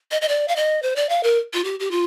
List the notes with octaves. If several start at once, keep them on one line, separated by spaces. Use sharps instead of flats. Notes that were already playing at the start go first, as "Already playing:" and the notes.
D#5
D#5
D5
F5
D#5
C5
D5
F5
A#4
F4
G4
G4
F4